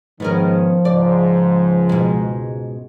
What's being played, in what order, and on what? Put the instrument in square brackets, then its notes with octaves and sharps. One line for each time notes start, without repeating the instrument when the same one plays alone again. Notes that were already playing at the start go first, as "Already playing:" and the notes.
[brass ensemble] G#2 D#3 [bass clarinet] F3 [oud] B3 C#4 A#4
[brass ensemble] C#2 G#2 [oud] D5
[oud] B2 G#3